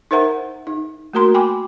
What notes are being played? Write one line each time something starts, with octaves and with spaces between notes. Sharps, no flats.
D#4 A#4 C5 E5 F#5 A#5
D#4
A3 A#3 F#4 A#4 A#5 C6
G5 G#5 B5 D6